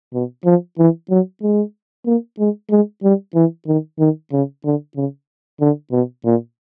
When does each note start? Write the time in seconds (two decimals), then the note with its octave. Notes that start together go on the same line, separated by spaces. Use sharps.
0.14 B2
0.45 F3
0.78 E3
1.10 F#3
1.42 G#3
2.06 A#3
2.39 G#3
2.71 G#3
3.03 G3
3.35 E3
3.67 D#3
3.99 D#3
4.32 C#3
4.64 D3
4.96 C#3
5.61 D3
5.92 B2
6.25 A#2